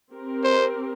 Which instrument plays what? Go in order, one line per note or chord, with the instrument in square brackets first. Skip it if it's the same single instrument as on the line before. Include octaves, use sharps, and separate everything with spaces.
[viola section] C4 G4 A#4
[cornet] C5